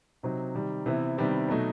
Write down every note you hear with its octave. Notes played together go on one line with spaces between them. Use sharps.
C3 F#3 C4 D#4
C3 D#3 G3
C3 E3 B3 E4
C3 D#3 G3 B3 E4
B2 F#3 A3 D#4